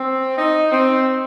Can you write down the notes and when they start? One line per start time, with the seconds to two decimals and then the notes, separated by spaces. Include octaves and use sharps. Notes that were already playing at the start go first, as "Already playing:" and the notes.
Already playing: C4
0.37 D#4
0.72 C4